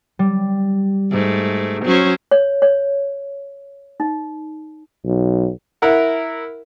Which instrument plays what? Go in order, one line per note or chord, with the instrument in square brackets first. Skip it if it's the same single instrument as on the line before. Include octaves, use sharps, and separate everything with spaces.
[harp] G3
[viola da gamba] G#2 A3
F#3 C#4 C5
[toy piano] C#5
C#5
D#4
[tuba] B1
[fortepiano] E4 A#4 F#5